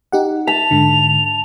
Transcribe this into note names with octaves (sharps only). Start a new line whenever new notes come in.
D#4 G4 F#5
A5 B6 F7
G#2 D3